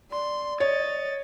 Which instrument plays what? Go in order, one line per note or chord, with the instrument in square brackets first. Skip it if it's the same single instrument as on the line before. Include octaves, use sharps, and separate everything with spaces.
[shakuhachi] D5 [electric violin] C6
[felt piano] C#5 [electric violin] D#5 A6